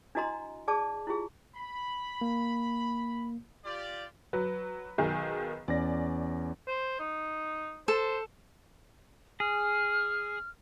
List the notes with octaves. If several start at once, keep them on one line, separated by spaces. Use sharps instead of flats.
D4 E4 F#4 D#5 A#5 C6
G#4 D5 A5 D6
E4 F4 G4 G#4
B5
A#3
F4 G4 D5
F#3 B4
B1 D#3 G#4
E2 C#4 D5 A#6
C5
D#4
A4 C5
G#4 F6